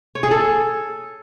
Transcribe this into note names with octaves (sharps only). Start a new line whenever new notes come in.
C#5
G#4
A4